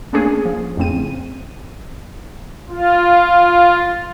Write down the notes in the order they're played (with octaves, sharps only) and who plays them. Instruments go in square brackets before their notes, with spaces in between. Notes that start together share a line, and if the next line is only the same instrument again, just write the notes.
[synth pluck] A3 A#3 C#4 D4 G#4
F3
F2 A2 C#3 C4 D#7
[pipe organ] F4